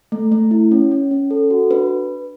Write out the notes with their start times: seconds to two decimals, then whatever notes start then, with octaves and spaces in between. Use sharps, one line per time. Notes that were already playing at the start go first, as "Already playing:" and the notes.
0.12 A3
0.32 A3
0.51 E4
0.72 C#4
0.91 C#4
1.11 C#4
1.31 A4
1.50 F#4
1.71 D4 B4